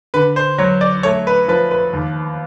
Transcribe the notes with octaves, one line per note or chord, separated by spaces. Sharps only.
D3 B4
C5
F#3 C#5
D5
A3 C#5
B4
F3 B4
B4
D#2